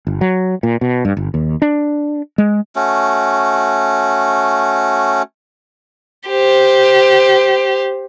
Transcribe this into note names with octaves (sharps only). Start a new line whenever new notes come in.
G1
F#3
A#2
B2
G2
G1
D#2
D4
G#3
A3 C#4 F#4
G4 C5